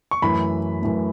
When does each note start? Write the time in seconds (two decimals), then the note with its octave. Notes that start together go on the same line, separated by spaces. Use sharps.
0.11 C#6
0.22 F#2 E3 A3 B5
0.82 F#2 E3 A3